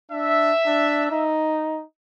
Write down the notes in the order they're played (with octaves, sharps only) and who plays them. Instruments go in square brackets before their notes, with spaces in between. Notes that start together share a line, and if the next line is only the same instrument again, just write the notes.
[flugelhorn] D4 [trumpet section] E5
[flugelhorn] D4
D#4